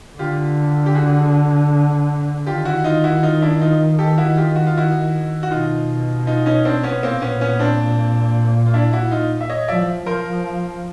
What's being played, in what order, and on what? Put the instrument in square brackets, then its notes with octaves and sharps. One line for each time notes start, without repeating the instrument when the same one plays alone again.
[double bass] D3 [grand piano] F4 G4
[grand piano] G4
F#4 G#4
[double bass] D#3 [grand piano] F4 G4
[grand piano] E4 F#4
D#4 F4
E4 F#4
D#4 F4
D4 E4
D#4 F4
G4 A4
E4 F#4
F4 G4
F#4
F4
E4 F#4
F#4
[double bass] B2 [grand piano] D#4 F4
[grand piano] D#4 F4
C#4 D#4
C4 D4
B3 C#4
[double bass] A#2 [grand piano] A#3 C4
[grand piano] B3 C#4
B3 C#4
C4 D4
F4
D4 E4
E4 F#4
D#4 F4
E5
C#5 D#5
[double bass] F3 [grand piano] D5 E5
[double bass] F3 [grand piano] A#4 C5